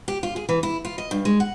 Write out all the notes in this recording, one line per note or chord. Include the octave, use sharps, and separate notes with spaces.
G4
F4
G#4
E3
E4
F4
D#5
G2
G#3
F#5